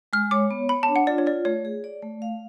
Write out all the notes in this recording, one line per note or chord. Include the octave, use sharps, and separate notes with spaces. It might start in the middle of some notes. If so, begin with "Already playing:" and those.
G#3 F6
C#5 D6
B3
C#5 B5
A5
D4
F#5
F4 D5
C#5
F4 D5
A3 C#5
G#4
D5
A3
F5